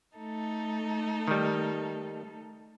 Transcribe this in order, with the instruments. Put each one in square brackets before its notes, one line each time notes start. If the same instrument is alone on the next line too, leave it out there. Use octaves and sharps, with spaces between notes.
[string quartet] A3 D#4 A4
[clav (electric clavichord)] D#3 G3